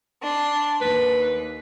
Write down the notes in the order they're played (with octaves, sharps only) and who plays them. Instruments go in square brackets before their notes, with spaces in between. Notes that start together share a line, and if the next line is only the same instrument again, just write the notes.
[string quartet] D4 C6
[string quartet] D#2 [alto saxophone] B4